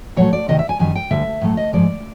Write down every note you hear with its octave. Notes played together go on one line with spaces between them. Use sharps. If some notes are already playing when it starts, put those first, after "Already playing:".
A#2 F#3 A3 C#5
D5
D2 C3 D#3 D#5
E5
G#5
F#2 D#3 G3 G#5
G5
D2 D3 G3 E5
A2 F#3 A3
D#5
G#2 F3 G#3 D5